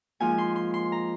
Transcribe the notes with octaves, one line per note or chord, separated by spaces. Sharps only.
G#2 F3 A#3 F4 G#5
C6
C6
C6
A#5